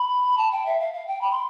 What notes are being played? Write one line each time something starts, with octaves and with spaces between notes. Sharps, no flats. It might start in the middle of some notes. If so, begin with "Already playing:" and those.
Already playing: B5
A5
G5
E5
F5
F5
G5
B5
C6